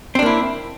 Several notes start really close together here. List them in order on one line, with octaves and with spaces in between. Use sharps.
C4 D4 A#3 E4